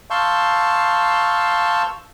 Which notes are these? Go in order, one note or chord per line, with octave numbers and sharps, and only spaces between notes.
F5 A5 C6 C#6 E6 G6